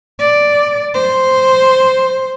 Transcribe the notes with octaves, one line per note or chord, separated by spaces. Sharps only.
D5
C5